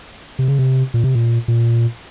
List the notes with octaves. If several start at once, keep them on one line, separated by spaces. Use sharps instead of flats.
C3
C#3
C3
A#2
C3
A#2
A#2